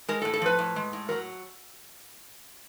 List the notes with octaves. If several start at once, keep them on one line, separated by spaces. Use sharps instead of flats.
G#3 A#4
A4
A2
A4
F3 B4
A2
G#3
A2
F#3 A#4